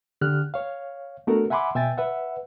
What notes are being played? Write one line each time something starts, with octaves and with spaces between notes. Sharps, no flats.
D3 G4 F6 F#6
C#5 F5
A3 B3 D4 F#4 A4 A#4
E5 F#5 G#5 B5 C6 D6
B2 E5 G5 G#5 A6
B4 E5 F#5